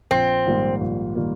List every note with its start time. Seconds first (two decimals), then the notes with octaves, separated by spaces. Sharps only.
0.11 A#1 C4
0.46 G#2 D#3 G3 A#3
0.81 A#1
1.15 D#3 G3 A#3